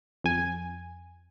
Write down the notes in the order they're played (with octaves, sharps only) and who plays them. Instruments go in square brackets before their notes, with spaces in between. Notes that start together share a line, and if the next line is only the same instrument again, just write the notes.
[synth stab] F2 G#5